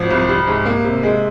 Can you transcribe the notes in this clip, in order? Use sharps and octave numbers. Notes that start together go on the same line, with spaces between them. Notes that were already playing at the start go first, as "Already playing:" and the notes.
Already playing: G#1 F3
C2
G3
G#2
A#3
C3
G#3